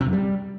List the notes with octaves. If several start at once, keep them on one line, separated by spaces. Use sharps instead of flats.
C3
F#2
G3